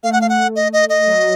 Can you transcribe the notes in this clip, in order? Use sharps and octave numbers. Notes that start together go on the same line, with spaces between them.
A3 F5
F#5
F5
F#5
D#5
D#5
D#5
F#3